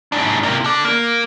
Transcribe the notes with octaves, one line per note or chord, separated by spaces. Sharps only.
G#2 D4
C3 A#3
A4 D5
A#3